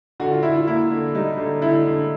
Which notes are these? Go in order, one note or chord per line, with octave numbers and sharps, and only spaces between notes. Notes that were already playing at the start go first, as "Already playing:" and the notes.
D3 F#4
F4
D3 E4
F4
A#3 E4
D3
G3 D#4
D3
D3 E4
D3